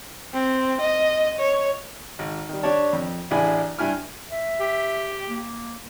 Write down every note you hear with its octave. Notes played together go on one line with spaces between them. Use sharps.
C4
D#5
C#5
G#1
D#3 G3
D4 G4 C#5 A5
F2
A1 D4 E4 G#4 G#5 B5
G2 E4 G#5 F6
E5
G4
A#3